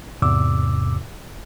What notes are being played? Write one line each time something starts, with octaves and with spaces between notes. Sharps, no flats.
E2 G#2 C3 D6 E6